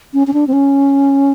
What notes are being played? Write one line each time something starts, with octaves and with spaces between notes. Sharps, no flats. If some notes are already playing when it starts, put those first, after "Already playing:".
C#4
C#4
D4
C4
C#4